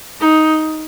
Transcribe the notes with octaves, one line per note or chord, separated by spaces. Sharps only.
D#4